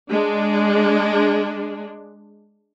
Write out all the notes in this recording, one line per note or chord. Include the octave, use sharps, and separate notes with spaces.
G#3 D4